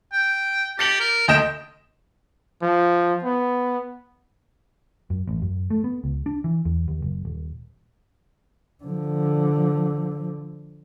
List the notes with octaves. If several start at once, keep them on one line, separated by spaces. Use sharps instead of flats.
G5
G4 A6 C#7 F#7
A#4
D2 D#5 G5 E7
F3
B3
F#2
A1
F#2
A3
B3
C#2
D4
E3
E2
D#2
F#1
D#1
D3 F3